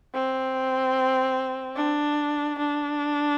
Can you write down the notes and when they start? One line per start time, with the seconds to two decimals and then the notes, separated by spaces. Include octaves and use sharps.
0.14 C4
1.76 D4
2.59 D4